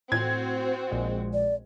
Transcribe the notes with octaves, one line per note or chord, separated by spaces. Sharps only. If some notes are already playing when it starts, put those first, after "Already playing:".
A2 C4 F#4 G#6
A#1 A#2 G#3
D5